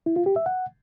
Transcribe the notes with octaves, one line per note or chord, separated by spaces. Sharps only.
E4
F4
G4
E5
F#5